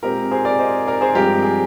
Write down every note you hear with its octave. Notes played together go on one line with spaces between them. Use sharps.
A#2 G#3 C4 G4 A#4
G#4 C5
A#4 D5
C5 D#5
A#4 D5
G#4 C5
G2 F3 G#3 C4 G4 A#4
G#4